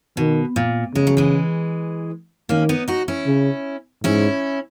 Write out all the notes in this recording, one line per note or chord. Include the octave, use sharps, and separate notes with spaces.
B2 D#3
A#2
C#3 G#3
F#3
E3 G#3
D#3 A#3 C#4
B3 D#4
D#4 F#4
C#4 E4
C#3
G#2 C#4 E4